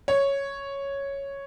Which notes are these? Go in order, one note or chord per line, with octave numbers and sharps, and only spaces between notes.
C#5